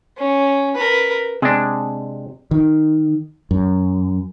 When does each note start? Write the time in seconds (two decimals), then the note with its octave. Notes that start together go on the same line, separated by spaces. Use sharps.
0.18 C#4
0.75 A#4 B4
1.42 C3 G#3 D4
2.51 D#3
3.51 F#2